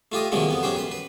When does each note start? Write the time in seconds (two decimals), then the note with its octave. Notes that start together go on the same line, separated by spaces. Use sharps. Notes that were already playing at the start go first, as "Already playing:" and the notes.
0.12 A3 F4 G4 D#5
0.32 C3 D#3 F3 F#3 G#3 A#3
0.48 F2 B3 D#4
0.63 F#2 C#4 G4 C5
0.76 B4 C6
0.92 B4